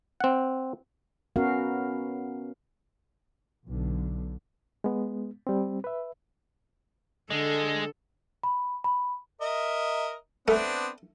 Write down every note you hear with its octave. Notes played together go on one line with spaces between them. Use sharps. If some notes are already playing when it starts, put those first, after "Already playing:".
C4 F#5
B3 C#4 F#4 A#4 F5
B1 D3
G#3 B3
G3 C4
B4 E5
D3 G#3 A4
B5
B5
A#4 D#5 E5
A3 B3 C4 D4